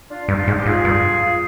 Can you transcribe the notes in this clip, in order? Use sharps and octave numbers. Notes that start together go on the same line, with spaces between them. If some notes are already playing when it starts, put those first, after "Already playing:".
D4 F4
G2 D4 F4
D#4
G#2 F4
G4
G#2 F4 G#4
G2